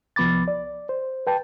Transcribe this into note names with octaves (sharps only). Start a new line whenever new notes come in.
C2 F3 B3 B5 D6 A6
D5
C5
B4 G5 A5